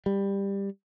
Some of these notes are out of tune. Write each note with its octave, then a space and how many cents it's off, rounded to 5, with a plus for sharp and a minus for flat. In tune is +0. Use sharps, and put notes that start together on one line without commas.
G3 +15